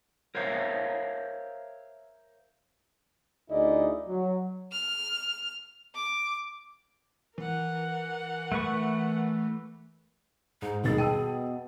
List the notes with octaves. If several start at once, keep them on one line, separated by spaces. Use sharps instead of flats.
A#4 C5 C#5 E5 F5
D2 D#4 E4 G#4 D5 D#5
F#3
F6
D6
E3 A#4 F#5
A3 B4 C#6
G#2 D#4
D#1 B2 D#3 G#4 A6
G5 A5 E6 D#7